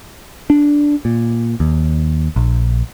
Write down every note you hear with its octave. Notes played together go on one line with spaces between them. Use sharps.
D4
A#2
D#2
A#1